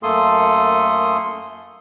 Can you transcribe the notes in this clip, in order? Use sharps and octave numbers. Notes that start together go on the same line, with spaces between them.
F#2 A3 A#3 A4 C6 D#6